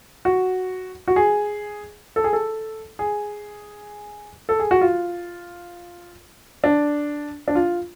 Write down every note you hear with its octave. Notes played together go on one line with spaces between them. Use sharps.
F#4
F#4
G#4
A4
G#4
A4
G#4
A4
G#4
F#4
F4
D4
D4
F4